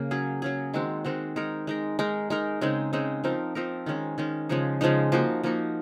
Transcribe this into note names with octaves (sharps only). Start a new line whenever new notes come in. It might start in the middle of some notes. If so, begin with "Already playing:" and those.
Already playing: C#3 A#3
F#3 C#4 G#4
F#3 C#4 G#4
D#3 G#3 C4 F#4
D#3 G#3 C4 F#4
G#3 D#4 A#4
G#3 D#4 A#4
G#3 D#4 A#4
G#3 D#4 A#4
C#3 G#3 C4 D#4
C#3 G#3 C4 D#4
F3 C4 D#4 A#4
F3 C4 D#4 A#4
D#3 G#3 C#4
D#3 G#3 C#4
C#3 F3 G#3 D#4
C#3 F3 G#3 D#4
F3 A#3 D#4 F#4
F3 A#3 D#4 F#4